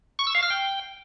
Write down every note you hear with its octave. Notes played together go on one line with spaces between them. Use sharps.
C#6
E6
F5
F6
G5